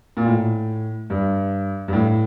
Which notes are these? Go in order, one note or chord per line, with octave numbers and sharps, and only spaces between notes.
A#2
A2
G2
G2
A2